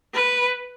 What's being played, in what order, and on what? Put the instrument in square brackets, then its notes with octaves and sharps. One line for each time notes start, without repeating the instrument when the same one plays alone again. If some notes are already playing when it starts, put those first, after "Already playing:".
[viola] B4